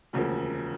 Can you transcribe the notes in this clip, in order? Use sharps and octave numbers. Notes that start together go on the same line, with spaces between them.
E1 D2 C#3 F3 A#3